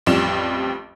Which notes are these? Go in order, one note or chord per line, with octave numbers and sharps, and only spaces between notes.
A1 F2 F3 G3 E7